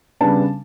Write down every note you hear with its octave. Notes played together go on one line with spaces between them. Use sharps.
C#3 G3 B3 D4 A5